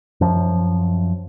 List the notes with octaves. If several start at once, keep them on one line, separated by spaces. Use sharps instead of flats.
F#2 F3